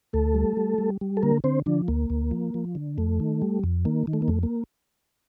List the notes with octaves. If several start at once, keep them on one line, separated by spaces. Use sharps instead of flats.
D2 A3 A4
G3
G3
G3
G3
A4
D3 A#3 A#4
D3 C4 C5
D3 F3 D4
D2 A#3
D2
F3
F3
D3
F2 A3
D#3
G3
F2
D#3 A#3
D#3
A3
A#3
F2 A3
A#3